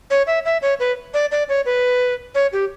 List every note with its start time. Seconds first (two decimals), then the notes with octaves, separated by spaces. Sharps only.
0.10 C#5
0.27 E5
0.45 E5
0.62 C#5
0.80 B4
1.14 D5
1.31 D5
1.49 C#5
1.66 B4
2.35 C#5
2.53 G4